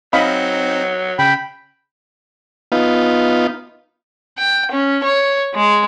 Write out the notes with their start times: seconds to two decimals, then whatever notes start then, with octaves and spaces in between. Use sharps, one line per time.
0.13 F#3 C4 D#4 D#5 F5 B5
1.19 C#3 G5 B5
2.72 B3 D#4 F4
4.38 G5
4.71 C#4
5.04 C#5
5.55 G#3